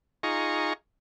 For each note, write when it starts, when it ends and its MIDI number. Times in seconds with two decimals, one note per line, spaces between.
0.23 0.73 63
0.23 0.73 65
0.23 0.73 68
0.23 0.73 82
0.23 0.73 85